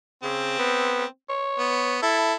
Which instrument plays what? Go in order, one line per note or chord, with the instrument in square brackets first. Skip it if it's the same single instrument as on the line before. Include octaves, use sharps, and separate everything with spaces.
[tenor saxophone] C#3 [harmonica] C4
[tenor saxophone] B3
C#5
[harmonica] B3
E4 A4